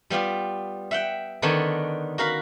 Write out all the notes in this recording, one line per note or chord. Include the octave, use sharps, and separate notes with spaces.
G3 B3 F4 G4
E5 F#5 G5
D3 D#3 B3 D#4 C#5 A5
F#4 A#4 F5 B5